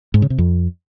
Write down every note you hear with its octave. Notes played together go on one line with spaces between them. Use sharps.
G#2
C#3
C3
F2